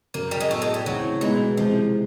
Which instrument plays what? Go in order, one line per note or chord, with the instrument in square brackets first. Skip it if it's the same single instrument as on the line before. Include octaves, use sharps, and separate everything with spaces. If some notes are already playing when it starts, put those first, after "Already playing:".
[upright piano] F#2 C#3 F#3 [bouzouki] A#3
[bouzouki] G3
G#3
[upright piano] A2 F#3 B3 [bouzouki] A3
[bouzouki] G#3
G3
[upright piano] C#3 E3 A3 C4 E4 [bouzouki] F#3
[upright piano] B2 G#3 B3 D#4 F#4 [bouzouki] E3
[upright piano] C3 E3 G#3 [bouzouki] F3